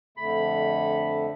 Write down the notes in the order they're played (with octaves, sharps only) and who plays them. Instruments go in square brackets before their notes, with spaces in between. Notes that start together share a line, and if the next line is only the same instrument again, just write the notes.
[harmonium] F2 D3 A3 [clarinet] B5